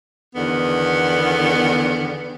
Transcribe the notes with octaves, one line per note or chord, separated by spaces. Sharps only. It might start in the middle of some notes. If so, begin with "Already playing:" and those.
E2 D3 D#3 B3